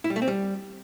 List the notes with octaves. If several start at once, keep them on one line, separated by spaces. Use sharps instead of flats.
E4
G3
A3
C4
G3